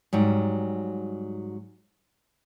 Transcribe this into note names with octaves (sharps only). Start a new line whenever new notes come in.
G#2 F#3 G3